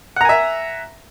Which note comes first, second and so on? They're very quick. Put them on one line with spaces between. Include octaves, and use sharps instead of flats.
F#5 A#5 G#5 E5